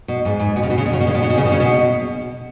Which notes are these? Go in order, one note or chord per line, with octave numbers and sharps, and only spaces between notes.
B2
G#2
G#2
B2
C#3
B2
C#3
B2
C#3
B2
C#3
B2
C#3
B2
C#3
B2
C#3
B2